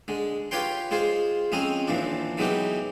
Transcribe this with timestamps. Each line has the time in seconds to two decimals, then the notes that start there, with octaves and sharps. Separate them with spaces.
0.08 D3 G#3
0.51 F4 G4 B4 C#5 G5 C6
0.91 G#3 F4 G#4 C5
1.52 F2 G#3 C4 C#4 D#5 A#5
1.88 D#2 E3 F3 D4
2.38 E3 F#3 G#3 B3 D#4 G4